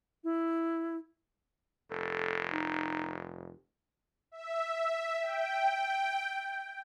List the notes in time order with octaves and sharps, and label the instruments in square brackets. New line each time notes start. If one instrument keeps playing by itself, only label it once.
[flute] E4
[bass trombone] F1 [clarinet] A4
[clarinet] D#4
[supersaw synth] E5
G5